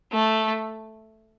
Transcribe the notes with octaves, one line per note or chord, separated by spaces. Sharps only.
A3